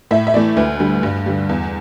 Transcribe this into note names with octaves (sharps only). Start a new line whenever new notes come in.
A2 E5
E5
E3 A3 D5
D2 B4
D3 G3
G2
D3 G3
E2